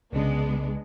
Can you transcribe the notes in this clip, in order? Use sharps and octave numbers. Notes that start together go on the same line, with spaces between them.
C2 C#3 G#3 B3 D4